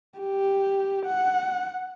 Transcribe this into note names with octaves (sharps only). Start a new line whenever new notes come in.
G4
F#5